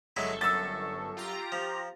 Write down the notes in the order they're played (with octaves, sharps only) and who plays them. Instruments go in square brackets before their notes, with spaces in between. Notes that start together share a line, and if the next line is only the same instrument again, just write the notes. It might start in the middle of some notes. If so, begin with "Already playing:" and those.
[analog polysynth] G1 A4 C#6 [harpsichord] F#3 G#3 E4
[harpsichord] F#2 [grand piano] E6 A6
[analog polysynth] F4 G4 A#5
[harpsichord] F3